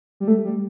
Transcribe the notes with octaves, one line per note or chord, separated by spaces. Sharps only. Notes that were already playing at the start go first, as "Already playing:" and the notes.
G3
A3
G3